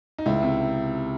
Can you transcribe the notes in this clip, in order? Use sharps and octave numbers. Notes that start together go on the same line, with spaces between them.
D#4
C#2 E4
C3